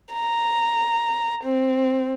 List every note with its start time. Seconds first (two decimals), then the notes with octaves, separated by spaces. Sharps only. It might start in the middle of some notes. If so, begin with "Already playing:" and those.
0.13 A#5
1.43 C4